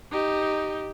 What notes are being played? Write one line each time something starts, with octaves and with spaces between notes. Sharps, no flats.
D#4 G4